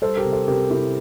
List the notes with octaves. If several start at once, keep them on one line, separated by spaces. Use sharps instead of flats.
G3 A4 C5
G4 A#4
C3
A4 C5
C3 G4 A#4
C3 E4 G4